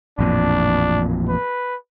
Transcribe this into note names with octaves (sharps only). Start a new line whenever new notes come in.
A1 F2 A#2 D4
B4